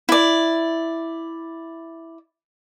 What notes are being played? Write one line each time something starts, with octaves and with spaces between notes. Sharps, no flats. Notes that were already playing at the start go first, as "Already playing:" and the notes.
E4 D5